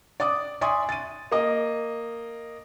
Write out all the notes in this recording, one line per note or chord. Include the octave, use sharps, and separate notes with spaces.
D5 D6 D#6
D5 E5 G#5 C6 C#6 D#6
A6 D#7
A#3 D#5